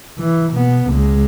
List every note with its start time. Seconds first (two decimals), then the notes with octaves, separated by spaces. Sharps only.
0.20 E3
0.54 B2 B3
0.89 C#2 G#3